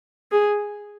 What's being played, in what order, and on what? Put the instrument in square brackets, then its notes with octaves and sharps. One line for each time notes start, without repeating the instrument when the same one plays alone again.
[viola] G#4